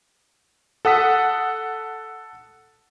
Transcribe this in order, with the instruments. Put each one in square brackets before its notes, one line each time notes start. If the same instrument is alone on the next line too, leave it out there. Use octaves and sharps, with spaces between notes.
[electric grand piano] A4 F#5 D#6 B6